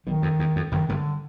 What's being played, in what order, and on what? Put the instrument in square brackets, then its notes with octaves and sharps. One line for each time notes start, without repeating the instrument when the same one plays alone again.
[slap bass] B1 B2 [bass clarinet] D#3
[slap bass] F2
E2
F2
[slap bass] F#1 F#2 [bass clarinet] D#3
[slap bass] G1 G2 [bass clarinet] D#3
[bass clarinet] D3